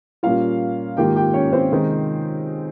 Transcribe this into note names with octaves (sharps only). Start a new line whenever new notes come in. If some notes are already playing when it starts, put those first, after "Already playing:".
A#2 G3 A#3 C#4 F4 F5
G#2 D#3 A#3 F4 G4 G5
G4 G5
C#4 C#5
C4 C5
C3 D#3 G#3 D#4